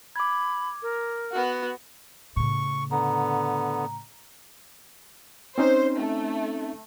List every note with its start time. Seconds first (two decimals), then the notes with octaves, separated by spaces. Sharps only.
0.16 B5 D6 G#6
0.82 A#4
1.32 B3 F#4
2.36 A2 C#3 C#6
2.91 D3 B3 A#5
5.58 C4 C#4 D#4 C5
5.96 A3